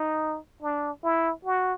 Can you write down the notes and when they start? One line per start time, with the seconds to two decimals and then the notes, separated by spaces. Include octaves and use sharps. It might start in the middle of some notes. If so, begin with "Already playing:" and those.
Already playing: D#4
0.62 D4
1.03 E4
1.45 F#4